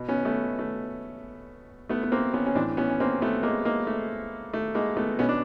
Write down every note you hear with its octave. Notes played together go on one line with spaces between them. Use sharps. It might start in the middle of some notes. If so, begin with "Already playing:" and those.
Already playing: B2
B3 C#4
A3 B3
A3
A3 B3
B3
A#3 C4
B3 C#4
C#4
A2 E3 C4 D4
B3 C#4
C#4
A#3 C4
A3 B3
G#3 A#3
G#3 A#3
A3
A3
G#3 A#3
A3 B3
B2 B3 C#4
D4